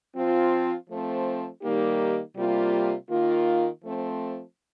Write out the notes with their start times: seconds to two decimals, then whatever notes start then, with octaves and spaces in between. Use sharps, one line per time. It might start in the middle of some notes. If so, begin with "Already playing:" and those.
0.15 F3 C4 F4
0.89 F3 A3 C4
1.62 D#3 G3 A#3 D#4 G4
2.36 C3 G3 A#3 F4
3.10 D#3 A#3 F4
3.83 F3 A3 C4